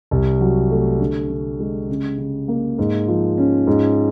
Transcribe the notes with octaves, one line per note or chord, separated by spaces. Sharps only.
C2
F#3
A3
D3
D3
G#3
C#3
C#3
A#3
G#2
F3
C#4
G#2